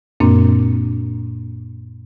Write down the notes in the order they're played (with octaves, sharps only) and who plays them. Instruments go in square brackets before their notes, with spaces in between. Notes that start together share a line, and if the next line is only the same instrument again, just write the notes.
[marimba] F#2 A#2 A#3 C4 D4